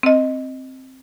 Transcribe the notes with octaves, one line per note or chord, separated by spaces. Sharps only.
C4 D#5